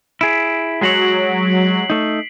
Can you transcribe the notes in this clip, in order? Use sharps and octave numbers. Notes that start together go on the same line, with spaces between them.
E4 G#4 B6 D7
F#3 G#3 F#4 C#5 B6 C7 F#7
A3 D#4